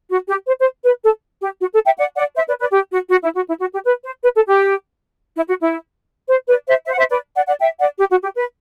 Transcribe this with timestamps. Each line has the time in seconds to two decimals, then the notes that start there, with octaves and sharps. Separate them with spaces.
0.10 F#4
0.29 G4
0.48 C5
0.60 C5
0.85 B4
1.04 A4
1.42 G4
1.60 F#4
1.73 A4
1.85 E5 G5
1.98 D5 F#5
2.17 D5 F#5
2.35 C5 E5
2.48 B4 D5
2.60 B4 D5
2.72 G4
2.92 F#4
3.10 F#4
3.23 E4
3.35 F#4
3.48 E4
3.60 F#4
3.73 G4
3.86 B4
4.04 C5
4.23 B4
4.36 A4
4.47 G4
5.36 E4
5.48 F#4
5.61 E4
6.29 C5
6.48 B4 D5
6.67 C5 E5
6.85 C5 E5
6.92 F#5
6.98 C5 E5
7.10 B4 D5
7.36 D5 F#5
7.47 D5 F#5
7.60 E5 G5
7.79 D5 F#5
7.98 G4
8.11 F#4
8.23 G4
8.35 B4